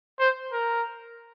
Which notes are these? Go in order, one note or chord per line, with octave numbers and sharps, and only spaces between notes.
C5
A#4